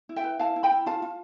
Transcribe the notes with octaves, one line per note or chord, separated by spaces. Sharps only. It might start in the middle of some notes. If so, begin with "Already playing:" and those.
E4
E5 G5
B4
E4 F5 A5
E4
G5 B5
E4
F4 F5 A5
F4